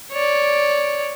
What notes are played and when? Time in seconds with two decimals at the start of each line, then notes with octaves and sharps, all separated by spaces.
0.12 C#5 D5